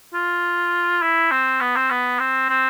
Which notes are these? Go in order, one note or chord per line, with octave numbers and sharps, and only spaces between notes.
F4
E4
C4
B3
C4
B3
C4
C4